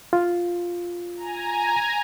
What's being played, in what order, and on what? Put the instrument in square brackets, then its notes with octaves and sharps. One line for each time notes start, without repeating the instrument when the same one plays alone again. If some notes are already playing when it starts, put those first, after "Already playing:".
[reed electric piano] F4
[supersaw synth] G#5 A#5